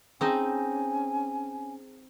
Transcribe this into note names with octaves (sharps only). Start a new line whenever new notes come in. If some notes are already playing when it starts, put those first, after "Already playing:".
C4 C#4 D#4 G#4 D#5 G#5 A5